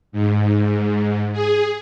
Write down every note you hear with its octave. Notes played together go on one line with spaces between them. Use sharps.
G#2
G#4